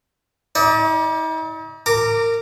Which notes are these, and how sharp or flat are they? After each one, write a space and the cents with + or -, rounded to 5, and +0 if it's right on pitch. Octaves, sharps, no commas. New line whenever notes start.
D#4 +45 D5 +15
A#4 -20 A#5 -25 D6 +0